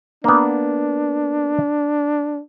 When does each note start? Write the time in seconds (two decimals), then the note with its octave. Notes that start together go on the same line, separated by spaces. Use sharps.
0.24 A#3 B3 D4